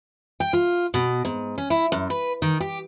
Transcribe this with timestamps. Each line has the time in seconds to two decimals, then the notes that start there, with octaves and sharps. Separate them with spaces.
0.40 G5
0.53 F4
0.94 B2
1.25 G#2
1.58 C#4
1.70 E4
1.92 F#2
2.10 B4
2.42 D#3
2.61 G4